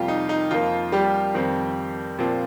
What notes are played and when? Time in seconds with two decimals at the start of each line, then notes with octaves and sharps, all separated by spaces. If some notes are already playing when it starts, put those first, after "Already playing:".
Already playing: F2 C3 G3 A#3 F4 G4
0.08 D#4
0.29 D#4
0.51 F2 F3 A#3 F4
0.92 G3 G4
1.34 F2 D#3 C4
2.19 A#2 F3 C4